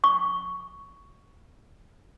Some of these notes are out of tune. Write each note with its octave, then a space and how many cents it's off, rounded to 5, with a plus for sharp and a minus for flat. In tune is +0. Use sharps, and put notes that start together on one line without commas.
C#6 +5